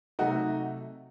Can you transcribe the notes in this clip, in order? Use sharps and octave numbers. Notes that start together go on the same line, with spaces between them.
C3 F#3 A3 D#4 F#4